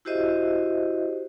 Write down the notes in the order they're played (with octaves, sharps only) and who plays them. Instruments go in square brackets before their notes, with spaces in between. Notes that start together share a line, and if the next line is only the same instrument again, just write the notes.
[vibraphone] E4 F#4 G4 C5 D#5 E5